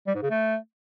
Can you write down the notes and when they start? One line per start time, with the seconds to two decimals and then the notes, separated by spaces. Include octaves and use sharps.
0.07 G3
0.15 G#2
0.22 C#3
0.30 A3